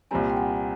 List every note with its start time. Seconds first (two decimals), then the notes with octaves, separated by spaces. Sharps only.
0.11 C2 A#2 G3 C4 G#5 A#5
0.30 G5
0.37 F#5 G#5